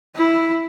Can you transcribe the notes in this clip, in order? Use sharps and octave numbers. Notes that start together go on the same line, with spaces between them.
E4